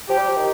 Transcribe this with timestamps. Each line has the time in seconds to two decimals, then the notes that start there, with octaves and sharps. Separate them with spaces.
0.09 F3 G4
0.18 G3
0.28 F3
0.37 D#3